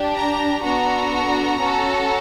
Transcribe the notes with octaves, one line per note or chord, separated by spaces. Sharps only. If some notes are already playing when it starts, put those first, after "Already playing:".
Already playing: D4 G4
A#5
B3 D4 F#4 A4 A#5
C#4 F#4 A4